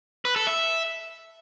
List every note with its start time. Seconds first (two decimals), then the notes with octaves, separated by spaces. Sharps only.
0.25 B4
0.36 A4
0.47 E5